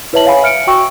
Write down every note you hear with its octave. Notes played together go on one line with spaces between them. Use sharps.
E4 B4 C#5 E5 A5 F#7
C#5 F5 G#5 B5
E5 F6 C#7 D7
F#4 G5 C#6 E6